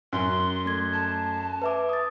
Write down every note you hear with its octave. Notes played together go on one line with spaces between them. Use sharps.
F#2 C6
A3 G#6
A5
B4 E5 D6
D#6 A6